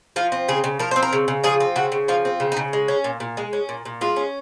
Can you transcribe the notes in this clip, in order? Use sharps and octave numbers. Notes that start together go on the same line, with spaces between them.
F3 F4
C4
C#3 G#4
C#3
F3 A#4
C4 C5
A#4
C#3
C#3
F3 G#4
C4
C#3 F#4
C#3
F3 F4
C4
C#3
D#4
C#3
G#3
C#4
A#2
A#2
G#3
C#4
A#2
A#2
G#3 F4
C#4